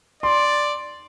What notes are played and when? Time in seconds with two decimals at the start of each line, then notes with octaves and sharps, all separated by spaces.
0.23 D5 C6